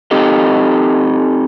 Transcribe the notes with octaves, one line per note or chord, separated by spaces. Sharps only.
C4 D#4 G4 A4 D#5